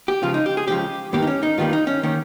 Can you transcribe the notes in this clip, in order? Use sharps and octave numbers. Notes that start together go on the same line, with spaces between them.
G4
C#2 C#3 F3 F4
D#4
G4
G#4
C#2 C#3 F3 G4
G2 D#3 G3 A#3 G4
D#4
C#4
D#4
G2 D#3 G3 A#3 F4
D#4
C#4
D#3 A#3 C#4